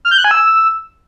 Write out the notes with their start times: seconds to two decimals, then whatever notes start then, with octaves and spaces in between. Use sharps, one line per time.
0.05 F6
0.11 G6
0.18 F#6
0.24 G#5
0.31 E6